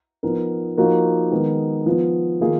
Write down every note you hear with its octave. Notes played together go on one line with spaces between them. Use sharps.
F3 B3 D#4 A#4
F3 A#3 D#4 F#4 A#4
D#3 G#3 B3 D#4 A#4
F3 B3 F4
D#3 A#3 F4 G#4